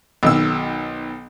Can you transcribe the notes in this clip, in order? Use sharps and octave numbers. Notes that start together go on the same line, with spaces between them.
B1 D#3 E6